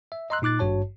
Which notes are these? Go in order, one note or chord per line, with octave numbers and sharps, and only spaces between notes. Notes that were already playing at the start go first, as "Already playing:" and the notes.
E5
D#5 A#5 C6 E6 F#6
A#2 D#4 D6 F#6 A6
G#1 G2 F#4 C#5 A5